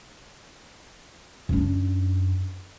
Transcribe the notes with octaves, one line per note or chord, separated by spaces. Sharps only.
F#2 D4